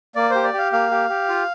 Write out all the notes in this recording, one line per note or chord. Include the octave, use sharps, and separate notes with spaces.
A#3 D5
G4 C5
D5
G4 F5
A#3 F5
G4
G4
F4